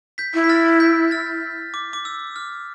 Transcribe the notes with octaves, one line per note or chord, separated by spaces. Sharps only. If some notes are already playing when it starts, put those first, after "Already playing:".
G6 B6
E4
B6
F6 A6
G6 B6
F6 A6
D6
D6
E6
F6